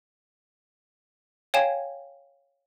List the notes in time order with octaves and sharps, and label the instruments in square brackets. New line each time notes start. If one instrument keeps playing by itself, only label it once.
[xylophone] C#5 F5 G5 G#5 G#6 E7